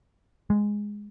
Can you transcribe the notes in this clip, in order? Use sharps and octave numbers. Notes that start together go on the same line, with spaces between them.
G#3